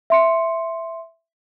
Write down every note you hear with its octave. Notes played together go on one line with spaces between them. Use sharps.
E5 C6 C#7